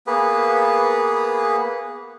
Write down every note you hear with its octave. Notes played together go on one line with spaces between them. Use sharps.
A#3 B3 G#4 B4